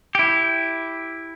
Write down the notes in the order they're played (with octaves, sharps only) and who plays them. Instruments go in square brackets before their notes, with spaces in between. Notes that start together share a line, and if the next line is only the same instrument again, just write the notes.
[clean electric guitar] E4 G4